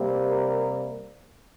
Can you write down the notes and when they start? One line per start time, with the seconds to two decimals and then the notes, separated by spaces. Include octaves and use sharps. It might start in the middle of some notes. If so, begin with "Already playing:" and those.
Already playing: C3 G3 A#3
0.29 A#4